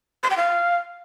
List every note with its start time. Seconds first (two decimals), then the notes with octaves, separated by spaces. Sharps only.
0.23 C6
0.30 G5
0.37 F5